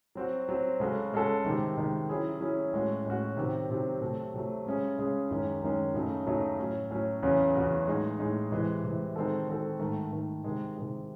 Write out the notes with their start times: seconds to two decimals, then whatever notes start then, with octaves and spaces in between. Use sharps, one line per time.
0.15 F#3 C4 F#4
0.49 F#3 C4 F#4
0.80 C#3 G#3 C#4 F#4 A4
1.13 C#3 G#3 C#4 F#4 A4
1.45 C3 D#3 G#3
1.77 C3 D#3 G#3
2.09 F#3 C#4 E4 G#4
2.41 F#3 C#4 E4 G#4
2.73 A2 G#3 C#4 F#4
3.06 A2 G#3 C#4 F#4
3.37 C3 D#3 F#3 C4
3.70 C3 D#3 F#3 C4
4.01 C3 F#3 A3
4.34 C3 F#3 A3
4.66 C#3 G#3 C#4 G#4
4.99 C#3 G#3 C#4 G#4
5.31 F#2 D#3 G#3 C#4
5.62 F#2 D#3 G#3 C#4
5.94 F#2 C#3 F#3 A3 D#4
6.27 F#2 C#3 F#3 A3 D#4
6.59 A2 F#3 C#4
6.90 A2 F#3 C#4
7.23 E2 C#3 F#3 C#4 F#4
7.55 E2 C#3 F#3 C#4 F#4
7.87 A2 G#3 D#4 G#4
8.19 A2 G#3 D#4 G#4
8.52 C3 E3 G#3
8.83 C3 E3 G#3
9.16 D#3 G#3 C4 F#4 A4
9.48 D#3 G#3 C4 F#4 A4
9.79 G#2 D#3 A3
10.12 G#2 D#3 A3
10.44 C3 D#3 G#3
10.77 C3 D#3 G#3